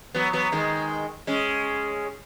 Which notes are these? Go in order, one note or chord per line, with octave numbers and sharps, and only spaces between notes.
F#3 B3
F#3 B3
D#3 G#3
G#3 C#4